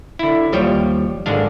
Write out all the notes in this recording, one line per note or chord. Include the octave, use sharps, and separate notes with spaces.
D3 E4
D#2 F3 G3 C#5 G5
G#1 D3 G#3 D4 F5